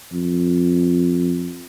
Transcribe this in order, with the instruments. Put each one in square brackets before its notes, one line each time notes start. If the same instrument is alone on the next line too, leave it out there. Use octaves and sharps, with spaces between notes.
[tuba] F2